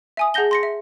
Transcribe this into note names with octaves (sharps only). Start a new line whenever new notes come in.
E5 G#5 D#6
G#4 F#5 A5 G6 A#6 G7
C6 A#6 C#7
E5